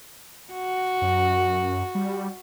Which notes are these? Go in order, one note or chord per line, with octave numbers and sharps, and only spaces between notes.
F#4
F#2
G3